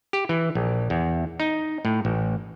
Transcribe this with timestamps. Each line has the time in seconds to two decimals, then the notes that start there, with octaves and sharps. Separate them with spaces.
0.13 G4
0.29 E3
0.55 A#1
0.90 E2
1.40 D#4
1.85 A2
2.05 A1